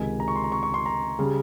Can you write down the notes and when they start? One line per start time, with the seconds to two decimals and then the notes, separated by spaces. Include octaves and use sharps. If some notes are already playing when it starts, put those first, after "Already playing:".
Already playing: C#2 C3 D#3 G#5
0.20 A#5
0.28 C#6
0.36 C6
0.44 A#5
0.52 C#6
0.63 C#6
0.74 C6
0.86 A#5
1.19 C#3 G3